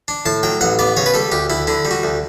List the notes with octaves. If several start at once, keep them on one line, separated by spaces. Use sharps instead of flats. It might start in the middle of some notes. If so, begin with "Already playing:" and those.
D4
A2 A5
F#3 G5
A1 F#5
B3 D5
C#3 C#5
B4
G3 A4
D2 G4
D2 E4
D3 E4
G3
F#4
D2